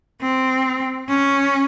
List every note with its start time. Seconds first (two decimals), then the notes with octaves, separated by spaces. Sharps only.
0.21 C4
1.09 C#4